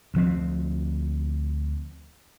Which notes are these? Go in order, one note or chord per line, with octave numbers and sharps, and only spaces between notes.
D2 F3 C4